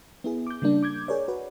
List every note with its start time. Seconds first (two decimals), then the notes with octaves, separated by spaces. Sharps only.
0.24 B3 E4 G#4
0.47 D6 G6
0.62 C#3 G3 A#3 D4
0.83 D6 G6 G#6
1.08 G#4 A#4 C#5 D5
1.28 F#4 B4